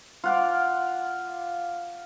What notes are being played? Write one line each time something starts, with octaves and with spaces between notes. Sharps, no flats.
F4 F#5 D6